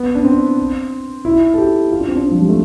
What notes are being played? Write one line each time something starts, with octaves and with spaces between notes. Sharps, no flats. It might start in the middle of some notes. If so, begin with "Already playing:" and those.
Already playing: B3
D4
C4
E4
A4
G4
F4
D4
C4
D4
F3
G3
A3